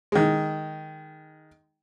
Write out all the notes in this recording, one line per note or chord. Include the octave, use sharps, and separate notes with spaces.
D#3 G#3